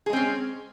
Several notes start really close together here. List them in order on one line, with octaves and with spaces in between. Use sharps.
G#4 G#3 C4 C#4